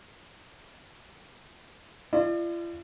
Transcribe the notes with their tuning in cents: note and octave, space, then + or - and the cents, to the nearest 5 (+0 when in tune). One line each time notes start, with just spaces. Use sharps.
F4 -45 D5 +35